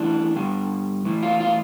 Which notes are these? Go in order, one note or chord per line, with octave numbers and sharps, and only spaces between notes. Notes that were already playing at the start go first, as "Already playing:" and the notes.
Already playing: A2 E3 D4
G2 D3
A2 E3
F4
F4